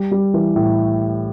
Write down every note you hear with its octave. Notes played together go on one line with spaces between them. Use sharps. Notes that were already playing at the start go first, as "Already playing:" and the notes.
Already playing: G3
G3
E3
A2